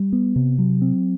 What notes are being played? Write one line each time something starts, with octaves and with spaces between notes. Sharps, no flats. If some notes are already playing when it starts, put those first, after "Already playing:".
Already playing: G3
B3
C3
F#3
C4